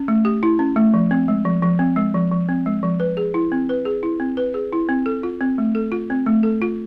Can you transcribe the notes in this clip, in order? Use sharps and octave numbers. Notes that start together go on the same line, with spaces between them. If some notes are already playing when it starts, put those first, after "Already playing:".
Already playing: C#4
A3
G4
E4
C#4
A3
F3
C4
G#3
F3
F3
C4
G#3
F3
F3
C4
G#3
F3
B4
G#4
E4
C4
B4
G#4
E4
C4
B4
G#4
E4
C4
A4
F4
C4
A3
A4
F4
C4
A3
A4
F4